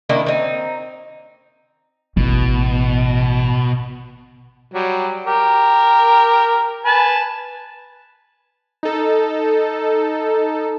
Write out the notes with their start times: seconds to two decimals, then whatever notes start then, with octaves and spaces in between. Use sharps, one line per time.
0.09 D#3 A#3 D4 E4
0.26 C4 D#4
2.17 A1 B2
4.73 F#3 G3
5.26 G4 A#4
6.85 B4 G#5 A5
8.83 D#4 A4